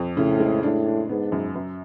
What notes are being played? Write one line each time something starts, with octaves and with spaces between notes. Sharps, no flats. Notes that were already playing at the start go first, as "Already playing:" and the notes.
Already playing: F2
A2 C#3
G#3
A2 D4
D4
G#2 B3
F#2
F#2